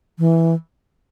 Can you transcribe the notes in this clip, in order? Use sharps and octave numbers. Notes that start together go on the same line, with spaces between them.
E3